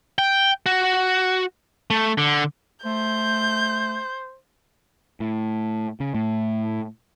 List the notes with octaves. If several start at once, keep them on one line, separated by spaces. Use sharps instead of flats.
G5
F#4
A3
D3
A3 C5 G6
A2
C#3
A2